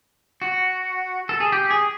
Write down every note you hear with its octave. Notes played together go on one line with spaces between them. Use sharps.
F#4
A4
G#4
G4
G#4